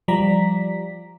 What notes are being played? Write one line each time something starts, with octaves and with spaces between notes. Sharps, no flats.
F3 G3 D5 A#5 B6